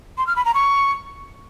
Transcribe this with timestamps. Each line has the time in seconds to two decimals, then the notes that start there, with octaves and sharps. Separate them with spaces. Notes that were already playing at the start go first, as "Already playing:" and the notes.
0.18 C6
0.27 F6
0.36 B5
0.45 A#5
0.54 C#6